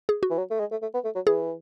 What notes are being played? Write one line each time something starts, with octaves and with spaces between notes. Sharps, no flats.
G#4
F#4
E3
F#3
A3
G#3
A3
A3
B3
A3
F#3
E3 G#4